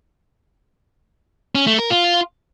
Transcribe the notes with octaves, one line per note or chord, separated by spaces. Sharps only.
C#4
A3
A#4
F4